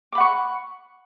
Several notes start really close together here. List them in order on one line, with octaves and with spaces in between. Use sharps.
D6 B5 F#5 C#6